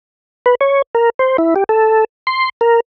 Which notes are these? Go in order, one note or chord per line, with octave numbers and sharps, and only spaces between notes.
B4
C#5
A#4
C5
E4
G4
A4
C6
A#4